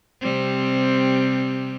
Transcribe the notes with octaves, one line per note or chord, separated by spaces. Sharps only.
C3 G3 C4